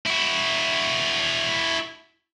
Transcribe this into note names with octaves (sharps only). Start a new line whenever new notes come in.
E4 F#4